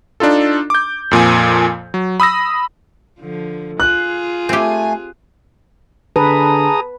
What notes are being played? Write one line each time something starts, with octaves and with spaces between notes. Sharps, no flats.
D4 D#4 F4 A4
D6 G6
F2 A#2 F3 G#5
F#3
B5 D#6 E6 A#6
D3 F3
F4 G#4 F#6
A3 C4 G4 G#5
D3 G#4 B4 A5 A#5 D#6